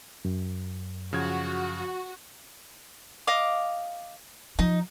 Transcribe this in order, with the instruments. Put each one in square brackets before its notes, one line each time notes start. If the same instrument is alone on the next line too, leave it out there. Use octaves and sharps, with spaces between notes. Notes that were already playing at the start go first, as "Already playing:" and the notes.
[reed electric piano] F#2
[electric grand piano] C#3 F3 G#6 [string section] F#4
[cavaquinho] D#5 F5 D6
[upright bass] F3 [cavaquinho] D#4